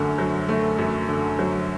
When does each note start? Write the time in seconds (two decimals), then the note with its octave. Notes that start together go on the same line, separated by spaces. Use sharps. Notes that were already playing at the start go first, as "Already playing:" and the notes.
Already playing: F#2 D3 A3
0.18 F#3
0.49 A3
0.78 F#2
1.09 D3
1.39 F#3